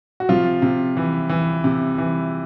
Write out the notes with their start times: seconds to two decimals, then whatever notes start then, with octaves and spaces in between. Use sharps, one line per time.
0.20 F#4
0.29 C3 F3 F4
0.62 C3
0.97 E3
1.29 E3
1.64 C3
1.98 E3